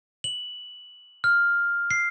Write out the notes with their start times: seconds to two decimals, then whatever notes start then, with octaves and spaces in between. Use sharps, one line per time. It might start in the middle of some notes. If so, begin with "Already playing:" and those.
0.24 F#7
1.24 F6
1.91 C7